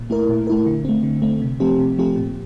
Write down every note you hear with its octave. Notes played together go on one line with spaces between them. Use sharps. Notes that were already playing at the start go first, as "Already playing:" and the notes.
Already playing: A#2
A3 E4 A#4
A#2
A3 E4 A#4
D3
A3 C4
D3
A3 C4
C3
F3 A3 C4 G4
C3
F3 A3 C4 G4
A#2